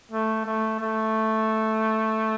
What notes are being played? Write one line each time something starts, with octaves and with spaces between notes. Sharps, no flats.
A3
A3
A3